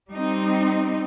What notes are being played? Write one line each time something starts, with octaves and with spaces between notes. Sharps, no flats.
G3 C4 D#4